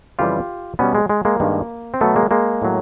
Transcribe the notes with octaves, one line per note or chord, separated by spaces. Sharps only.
F2 C#3 E3 G3 F4 G4
B2 G3 B3 C#4
G#3
G#3
G#3 A#3
G2 D#3 G#3
C4
B2 F#3 A3 B3
G#3 A#3
G#3 A#3
A2 F#3